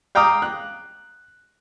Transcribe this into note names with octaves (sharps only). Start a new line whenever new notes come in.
F5 G5 A#5 D6 D#6
F#6